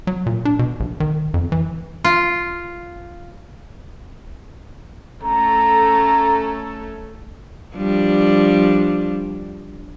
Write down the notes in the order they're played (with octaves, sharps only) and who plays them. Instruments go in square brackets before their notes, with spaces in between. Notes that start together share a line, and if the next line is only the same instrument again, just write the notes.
[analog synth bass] F#3
A#2
D4
B2
A#1
D#3
F2
E3
[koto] F4
[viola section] A3 C#4 A4 [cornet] A#5
[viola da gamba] F3 G3 D4